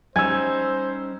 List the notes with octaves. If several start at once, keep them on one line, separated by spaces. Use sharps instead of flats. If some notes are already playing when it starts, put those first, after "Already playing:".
G3 C#4 D#4 C5 G#5 E6 G#6